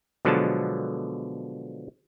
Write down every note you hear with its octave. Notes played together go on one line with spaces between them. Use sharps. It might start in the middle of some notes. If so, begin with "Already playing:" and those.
B2 D3 F3 F#3 G#3 A5